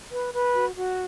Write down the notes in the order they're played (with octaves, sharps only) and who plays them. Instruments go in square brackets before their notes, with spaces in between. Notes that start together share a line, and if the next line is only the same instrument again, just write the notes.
[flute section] B4
B4
F#4
F#4